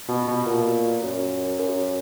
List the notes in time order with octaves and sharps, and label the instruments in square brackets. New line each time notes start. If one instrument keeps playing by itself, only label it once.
[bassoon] B2
B2
A#2
F#2
F#2